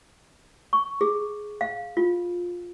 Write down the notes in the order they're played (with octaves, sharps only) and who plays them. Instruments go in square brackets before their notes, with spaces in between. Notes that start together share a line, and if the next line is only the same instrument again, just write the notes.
[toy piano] C#6
G#4
F5
F4